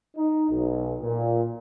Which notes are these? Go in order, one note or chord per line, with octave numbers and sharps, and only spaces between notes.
D#4
B1
A#2